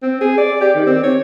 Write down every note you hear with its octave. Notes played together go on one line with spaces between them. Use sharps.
C4
G#4
D5
G4
D#3
C4
C#5